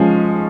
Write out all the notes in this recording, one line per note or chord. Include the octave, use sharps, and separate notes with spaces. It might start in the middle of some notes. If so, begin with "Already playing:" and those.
Already playing: F3 G#3 C#4